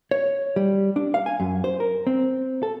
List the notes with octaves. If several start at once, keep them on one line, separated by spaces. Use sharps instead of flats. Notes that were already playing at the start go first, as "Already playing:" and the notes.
C#5
G3
D4
F5
G#5
F#2
C5
A#4
C4
A4